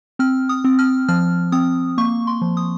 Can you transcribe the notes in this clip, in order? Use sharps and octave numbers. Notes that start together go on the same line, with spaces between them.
C4 F6
D#6
C4
F6
F3 F6
C4 D#6
A#3 C#6
C6
F3
D#6